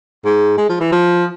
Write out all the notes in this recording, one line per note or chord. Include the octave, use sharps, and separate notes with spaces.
G#2
G#3
F3
E3
F3